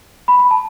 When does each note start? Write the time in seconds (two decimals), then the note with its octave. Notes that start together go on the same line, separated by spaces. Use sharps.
0.28 B5
0.39 B5
0.51 A5